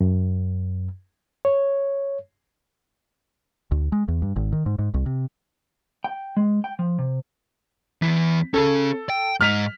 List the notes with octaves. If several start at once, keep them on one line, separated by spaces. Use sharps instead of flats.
F#2
C#5
D2
G#3
E2
G2
G#1
D#3
G#2
G#2
C2
C3
G5
G#3
G5
F3
C3
E2 E3 B6
C#4 G#4 A4
G5
G#2 D#5 F6 B6 F7